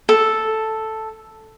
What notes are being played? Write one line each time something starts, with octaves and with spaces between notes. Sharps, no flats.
A4